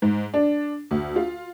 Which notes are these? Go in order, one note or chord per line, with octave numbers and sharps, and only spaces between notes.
G#2
D4
D2
F4